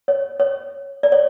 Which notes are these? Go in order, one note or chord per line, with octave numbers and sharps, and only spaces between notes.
C#5
C#5
D5
C#5